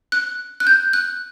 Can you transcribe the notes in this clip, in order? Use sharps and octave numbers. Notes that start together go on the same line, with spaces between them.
F#6
F#6
G6
F#6